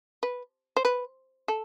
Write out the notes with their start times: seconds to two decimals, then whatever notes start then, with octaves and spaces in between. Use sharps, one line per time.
0.23 B4
0.77 C5
0.85 B4
1.48 A4